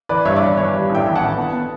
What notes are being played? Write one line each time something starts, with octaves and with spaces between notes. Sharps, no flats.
E3 B4 D5
G2 C#5 E5
D5
E3 C#5
E3 C#5
G3
A1
E5 G5
E3
F#5 A5
A1
B3
B3